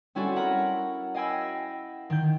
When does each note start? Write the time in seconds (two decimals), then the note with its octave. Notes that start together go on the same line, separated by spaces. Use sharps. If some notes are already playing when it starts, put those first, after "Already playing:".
0.15 G3 C4 C#4 E4 F#4 A4
0.36 A#4 F#5 A#5 B5
1.14 D#5 F5 G5 G#5 B5 E6
2.10 D#3 G6